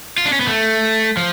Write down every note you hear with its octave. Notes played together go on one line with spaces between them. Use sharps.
F4
D4
C#4
B3
A3
F3